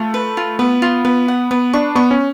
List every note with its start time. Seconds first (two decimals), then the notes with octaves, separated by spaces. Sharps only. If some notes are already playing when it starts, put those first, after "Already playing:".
Already playing: A3 F4
0.14 B4
0.37 F4
0.59 B3 B4
0.82 F4
1.05 B3 B4
1.28 F#5
1.51 B3 B4
1.73 D4 C#6
1.95 B3 C#6
2.11 C#4